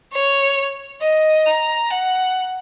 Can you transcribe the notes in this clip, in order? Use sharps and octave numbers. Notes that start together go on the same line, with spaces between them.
C#5
D#5
A#5
F#5